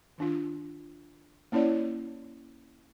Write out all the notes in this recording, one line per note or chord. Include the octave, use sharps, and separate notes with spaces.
D#3 D4 F4
A#3 C#4 E4 C#5 D5